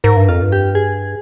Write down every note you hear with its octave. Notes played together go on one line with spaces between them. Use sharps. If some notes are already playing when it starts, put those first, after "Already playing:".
G#2 A#4
G2
F2 F4
G2
G4
G#4